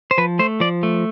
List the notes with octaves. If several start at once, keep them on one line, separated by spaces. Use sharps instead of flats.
C5
F3 B4
A3 C5
F3 D5
A3